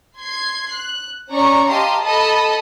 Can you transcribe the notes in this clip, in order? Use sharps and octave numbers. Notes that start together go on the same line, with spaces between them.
C6 G#6 C7
F#6
C#4 D5 A#5 C#6
G4 D#5 F5 A5 A#5 C6
A4 D#5 A5 B5